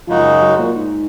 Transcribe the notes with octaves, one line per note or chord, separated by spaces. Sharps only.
F#2 C#3 F3 G#3 D#4 F#4
F#3
A#2
G#2